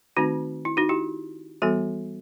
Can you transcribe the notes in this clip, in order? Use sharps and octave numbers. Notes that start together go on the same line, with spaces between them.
D#3 A3 C4 D#4 F#4
E4
D#4 F#4
E4 G4
E3 G3 B3 F#4 A4